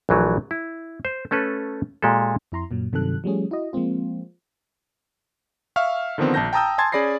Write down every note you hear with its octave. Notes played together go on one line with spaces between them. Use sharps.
A#1 E3 F#3 A3
E4
C5
A3 C#4 A4 B4
A#2 G#3 G4 A4
F2 E4 A#5 C6
F#2 A#2 F#3
G2 C3 D#3 F#3 A4 F#6
F3 G3 A3 C#4 G#4
E4 F#4 D#5
F3 G#3 A#3 C4 F4
E5 F5 C#6 F6
D3 D#3 F3 B3 C4
A#1 A5 G6 A#6
G5 A5 A#5 D#6 E6 G6
G#5 A5 C6 G#6 A6
C#4 G#4 D5 B5 A#6 C7